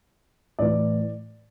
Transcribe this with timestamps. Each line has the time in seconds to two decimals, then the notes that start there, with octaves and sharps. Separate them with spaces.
0.59 A2 E3 D5